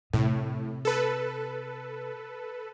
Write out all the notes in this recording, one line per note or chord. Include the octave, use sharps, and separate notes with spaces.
A2 C3
A4 B4